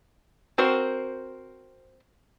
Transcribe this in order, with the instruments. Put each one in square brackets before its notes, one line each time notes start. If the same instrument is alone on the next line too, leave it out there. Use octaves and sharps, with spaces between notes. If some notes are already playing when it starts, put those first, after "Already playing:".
[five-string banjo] C4 F#4 A#4 C5